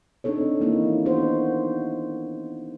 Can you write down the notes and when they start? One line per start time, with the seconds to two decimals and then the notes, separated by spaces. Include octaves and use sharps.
0.24 C4 D4 D#4 A4 C#5
0.60 D#3 E3 A#3 D#4 E4
1.05 B3 D4 D#4 F#4 C5